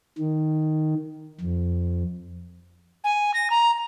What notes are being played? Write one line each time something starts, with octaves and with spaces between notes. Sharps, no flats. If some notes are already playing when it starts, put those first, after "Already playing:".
D#3
F2
G#5
A#6
A#5